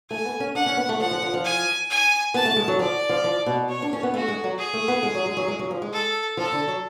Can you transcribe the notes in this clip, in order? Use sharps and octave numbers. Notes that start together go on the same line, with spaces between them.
A3 G#5
B3
C#4
D4 F#5
C#4
B3
A3
F3 F#5
F3
F3
F3
G#5
G#5
B3 A5
A3
G#3
F#3
F3 D5
F3
F3
B2
C#5
D4
C#4
B3
A3 F#4
G#3
F#3
G#4
A3
B3
G#3
F#3
G#3
F#3
G#3
F#3
F3
G#3
A4
F3 A4
D3
F#3